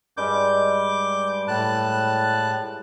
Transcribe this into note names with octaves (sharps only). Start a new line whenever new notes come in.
G2 G3 G#3 D6 G6
A2 A5 F#6